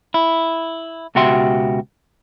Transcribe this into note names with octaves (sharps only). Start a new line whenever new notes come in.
E4
C#2 B2 F#4 G4 E5 C6